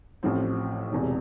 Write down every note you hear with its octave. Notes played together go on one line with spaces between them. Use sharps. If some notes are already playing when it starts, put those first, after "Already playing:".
A1 A2 F3 C4
E1 E2 C3